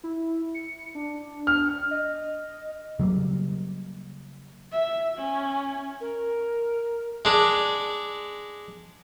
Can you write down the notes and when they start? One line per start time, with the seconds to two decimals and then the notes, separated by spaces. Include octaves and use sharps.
0.04 E4
0.54 C#7
0.95 D4
1.47 F6
1.91 D#5
2.99 C#3 F#3 G3 A#3
4.72 E5
5.17 C#4
6.01 A#4
7.25 G#3 D4